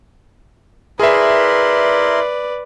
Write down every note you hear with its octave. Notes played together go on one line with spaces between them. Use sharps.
E4 G#4 A#4 B4 D5 E5 C6